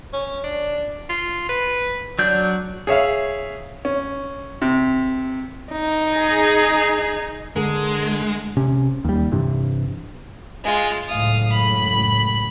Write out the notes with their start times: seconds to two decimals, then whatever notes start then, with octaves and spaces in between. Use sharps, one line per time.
0.13 C#4
0.44 D4
1.09 F4
1.49 B4
2.19 F#3 D4 G6
2.87 G#4 C#5 E5 F5
3.85 C#4
4.62 C3
5.72 D#4
6.13 G#4
7.56 D3 G#3 G#4 A#4
8.57 C3 C#4
9.04 D#2 G3
9.32 G2 C3 E3
10.64 G#3 F4
11.08 C#2 F#2 A2 F5 D#6
11.52 B5